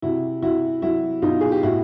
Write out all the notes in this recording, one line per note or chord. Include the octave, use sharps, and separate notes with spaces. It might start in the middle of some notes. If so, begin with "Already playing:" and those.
C3 E4 F#4
C3 E4 F#4
F#3 E4 F#4
B2 D#4 F4
G#4
G4
A2 E4 F#4